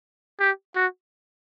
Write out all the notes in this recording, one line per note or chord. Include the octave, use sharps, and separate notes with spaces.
G4
F#4